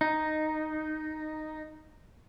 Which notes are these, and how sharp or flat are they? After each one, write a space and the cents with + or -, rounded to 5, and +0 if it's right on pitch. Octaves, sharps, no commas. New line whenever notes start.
D#4 -5